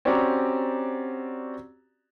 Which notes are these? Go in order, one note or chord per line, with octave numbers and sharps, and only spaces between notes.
C4 C#4 F#4 G4 D5 A#5